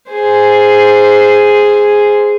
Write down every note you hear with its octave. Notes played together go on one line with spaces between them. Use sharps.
G#4 C5